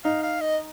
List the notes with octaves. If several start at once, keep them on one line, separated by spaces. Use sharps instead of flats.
D#4 F5
F5
D#5